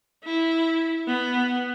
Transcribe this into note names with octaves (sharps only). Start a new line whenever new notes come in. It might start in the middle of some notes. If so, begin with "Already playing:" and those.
E4
B3